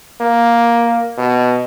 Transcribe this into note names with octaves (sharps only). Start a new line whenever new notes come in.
A#3
B2